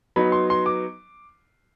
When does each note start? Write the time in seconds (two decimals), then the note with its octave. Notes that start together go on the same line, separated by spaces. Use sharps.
0.16 F#3 B3 D#4 B5
0.32 C6
0.50 C6
0.66 D6